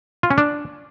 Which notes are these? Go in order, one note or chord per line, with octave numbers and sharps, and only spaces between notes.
F4
C#4
D4